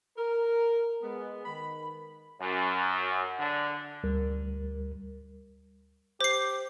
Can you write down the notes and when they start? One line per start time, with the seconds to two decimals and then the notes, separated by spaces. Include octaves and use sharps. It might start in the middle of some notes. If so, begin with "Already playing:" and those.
0.17 A#4
1.03 G#3 B3
1.45 D#3 B5
2.41 F#2
3.40 D3
4.04 D2 G3 A#4
6.21 G4 C5 C7